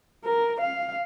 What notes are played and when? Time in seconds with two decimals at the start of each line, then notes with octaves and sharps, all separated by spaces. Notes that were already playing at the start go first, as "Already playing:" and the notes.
0.24 A#4
0.61 F5